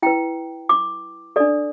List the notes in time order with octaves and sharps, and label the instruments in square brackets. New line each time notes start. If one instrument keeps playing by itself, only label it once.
[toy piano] E4 B4 G5
D6
D4 A4 D5